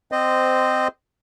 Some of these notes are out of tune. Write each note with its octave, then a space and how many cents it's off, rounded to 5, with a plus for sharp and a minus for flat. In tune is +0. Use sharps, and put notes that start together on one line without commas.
C4 -15 C5 -10 D#5 -20